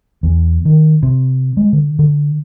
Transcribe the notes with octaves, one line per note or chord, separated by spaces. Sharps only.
E2
D#3
C3
G#3
D3
D3